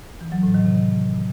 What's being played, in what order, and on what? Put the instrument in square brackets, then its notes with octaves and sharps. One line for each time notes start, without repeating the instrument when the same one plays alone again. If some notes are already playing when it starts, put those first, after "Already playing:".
[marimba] E3
F#3
A2
D#3
C3